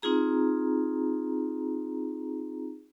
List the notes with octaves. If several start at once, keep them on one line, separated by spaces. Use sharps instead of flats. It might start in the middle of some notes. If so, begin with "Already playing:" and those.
C4 D#4 F4 G#4 A#5